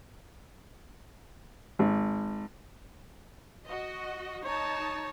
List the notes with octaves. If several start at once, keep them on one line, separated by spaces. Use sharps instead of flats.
G#1
F#4 D#5
D#4 C#5 A5